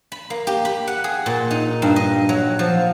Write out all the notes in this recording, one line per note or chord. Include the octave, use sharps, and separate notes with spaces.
B5
A#3
G4
B5
F#5
G#4
A#2
D#4
G2
D#5
F#3
F3